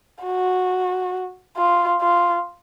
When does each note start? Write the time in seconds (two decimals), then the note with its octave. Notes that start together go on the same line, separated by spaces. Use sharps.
0.24 F#4
1.57 F4
2.01 F4